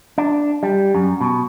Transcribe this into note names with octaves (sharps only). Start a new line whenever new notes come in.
D4
G3
F#2
B2